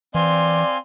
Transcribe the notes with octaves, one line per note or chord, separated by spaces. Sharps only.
E3 C4 D5 F5 G#5 C6